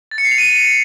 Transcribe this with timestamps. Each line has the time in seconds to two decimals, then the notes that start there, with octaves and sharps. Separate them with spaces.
0.11 A6
0.18 C#7
0.25 C7
0.31 F7
0.38 D#7